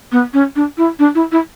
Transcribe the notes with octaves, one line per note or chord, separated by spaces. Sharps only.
B3
C#4
D4
E4
D4
E4
E4